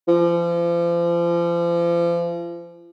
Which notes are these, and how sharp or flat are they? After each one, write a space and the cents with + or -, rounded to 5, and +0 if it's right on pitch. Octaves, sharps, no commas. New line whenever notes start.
F3 -35